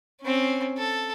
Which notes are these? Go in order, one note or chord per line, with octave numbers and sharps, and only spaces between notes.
C4 C#4
A4